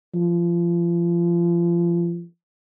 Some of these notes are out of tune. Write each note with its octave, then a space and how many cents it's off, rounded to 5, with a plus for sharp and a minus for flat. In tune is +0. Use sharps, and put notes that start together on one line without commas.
F3 -30